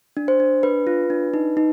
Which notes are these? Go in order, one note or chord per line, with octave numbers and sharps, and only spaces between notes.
D4
C5
D4
D4 B4
F4
D4
D#4
D#4